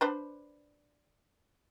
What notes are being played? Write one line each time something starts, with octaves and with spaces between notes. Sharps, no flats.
D4 B4 C5